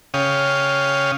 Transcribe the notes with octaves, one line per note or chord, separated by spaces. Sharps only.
C#3 C#5 F5 G5 D#6